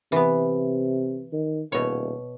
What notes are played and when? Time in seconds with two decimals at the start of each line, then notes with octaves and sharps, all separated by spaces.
0.12 C3 E3 B3
1.32 D#3
1.72 D#1 B2 C#5